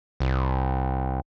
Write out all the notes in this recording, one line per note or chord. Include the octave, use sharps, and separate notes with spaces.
C2